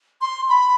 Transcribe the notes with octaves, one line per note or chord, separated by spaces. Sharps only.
C6
B5